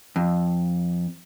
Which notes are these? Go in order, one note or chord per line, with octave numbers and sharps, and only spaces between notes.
F2